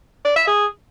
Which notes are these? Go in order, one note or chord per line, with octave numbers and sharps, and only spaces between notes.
D5
E5
G#4